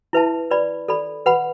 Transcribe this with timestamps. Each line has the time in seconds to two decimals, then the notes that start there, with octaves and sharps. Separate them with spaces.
0.13 E4 B4 E5 A5
0.51 B4 D5 B5
0.88 A4 D5 B5
1.26 B4 F#5 B5